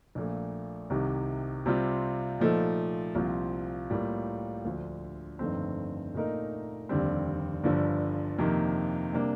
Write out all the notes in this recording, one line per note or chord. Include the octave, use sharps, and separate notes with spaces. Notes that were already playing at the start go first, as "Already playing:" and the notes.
A#1 A#2 A3
C2 C3 D#3
C3 G3 C4 F4
A#2 F3 A3 D#4 A4
C2 A#2 F3 C4 F4
A2 G3 A#3 F4
D2 D3 F3
G1 F2 D#3 A3 C4
A#2 A3 D#4 A#4
F1 D#2 D3 G3 C4
G1 G2 D3 F3
F2 C3 D#3 A#3
C3 G3 A#3 D4